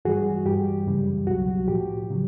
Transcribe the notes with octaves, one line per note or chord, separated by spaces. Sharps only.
G2 E3 G3 F#4 G#4
G2 E3 G3 G4
F#2 C#3 E3 G3
C2 B2 F#3 F#4
A2 F3 G4
C#3 F#3